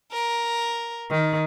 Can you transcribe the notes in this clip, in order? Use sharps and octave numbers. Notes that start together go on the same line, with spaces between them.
A#4
D#3